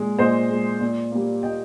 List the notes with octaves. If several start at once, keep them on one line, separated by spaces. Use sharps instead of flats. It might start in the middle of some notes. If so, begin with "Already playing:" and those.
Already playing: A#2 G#3
A#2 C5 D#5
G#3
A#2
G3 A#3
A#2 D#5 G5